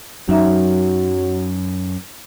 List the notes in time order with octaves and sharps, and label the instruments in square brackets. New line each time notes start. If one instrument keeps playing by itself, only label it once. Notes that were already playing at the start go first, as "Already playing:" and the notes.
[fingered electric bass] F#2 [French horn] F#3 [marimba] D#4 E5 A#5